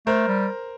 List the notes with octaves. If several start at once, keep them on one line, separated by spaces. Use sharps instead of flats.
A3 A#4 C5
G3